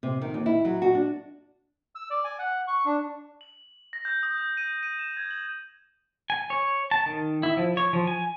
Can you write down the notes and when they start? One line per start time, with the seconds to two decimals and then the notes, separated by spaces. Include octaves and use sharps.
0.03 C3
0.21 D#3
0.34 D#2
0.46 E4
0.65 F#3
0.82 F#4
0.95 D4
1.95 E6
2.10 D5
2.24 G#5
2.39 F#5
2.68 C#6
2.85 D4
3.41 F#7
3.93 A#6
4.05 G6
4.23 D#6
4.37 G6
4.57 D#7
4.83 D#7
4.99 E7
5.17 G#6
5.31 F#7
6.30 G#5
6.50 C#5
6.91 A5
7.06 D#3
7.43 E4
7.57 F3
7.77 C#5
7.93 F3
8.07 G#5